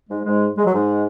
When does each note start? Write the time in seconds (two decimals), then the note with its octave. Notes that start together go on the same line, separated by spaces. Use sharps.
0.09 G#2 G#3
0.26 G#2 G#3
0.57 G#3
0.66 F#3
0.73 G#2 G#3